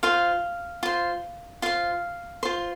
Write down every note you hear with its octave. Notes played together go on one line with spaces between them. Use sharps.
F4 C5 F5
F4 C5
F4 C5 F5
F4 C5